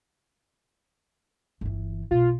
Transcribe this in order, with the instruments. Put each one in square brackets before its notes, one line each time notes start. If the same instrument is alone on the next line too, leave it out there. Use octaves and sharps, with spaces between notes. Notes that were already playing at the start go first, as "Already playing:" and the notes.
[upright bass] G1 E3
[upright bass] B1 B2 [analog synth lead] F4